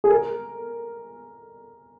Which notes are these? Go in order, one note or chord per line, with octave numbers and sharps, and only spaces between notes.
G#4
A#4